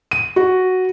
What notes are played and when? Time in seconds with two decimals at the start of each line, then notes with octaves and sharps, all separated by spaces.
0.11 D#7
0.36 F#4